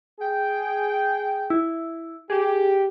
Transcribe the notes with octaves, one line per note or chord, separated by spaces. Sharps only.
G#4 G5
E4
G4 G#4